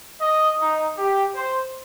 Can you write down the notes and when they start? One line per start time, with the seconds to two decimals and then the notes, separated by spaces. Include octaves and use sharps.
0.22 D#5
0.59 D#4
0.97 G4
1.34 C5